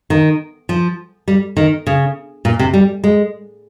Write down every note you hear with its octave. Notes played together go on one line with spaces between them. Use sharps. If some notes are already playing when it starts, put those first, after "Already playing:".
D#3
F3
G3
D#3
C#3
A#2
C3
G3
G#3